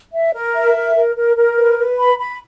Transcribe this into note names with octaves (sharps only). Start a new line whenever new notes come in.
E5
A#4
E5
A#4
A#4
A#4
A#4
B4
B4
B5
B5